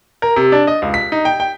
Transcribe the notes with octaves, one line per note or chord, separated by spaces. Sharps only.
A#4
C3
D4
D#5
C#2
B6
D#4
G5
G5